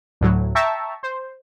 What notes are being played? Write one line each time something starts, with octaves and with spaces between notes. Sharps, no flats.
D2 A2 F#3
E5 G5 A5 A#5 C#6
C5